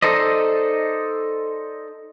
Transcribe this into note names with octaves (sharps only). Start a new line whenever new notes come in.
D#4 A4 C5 D5 D#5